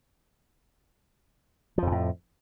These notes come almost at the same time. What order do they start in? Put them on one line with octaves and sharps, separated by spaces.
F3 F2 C3 A2